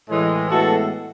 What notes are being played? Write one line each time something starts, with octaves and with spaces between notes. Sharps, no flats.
A2 E3 G#3
A2 E3 G#3 B3 F#4 A4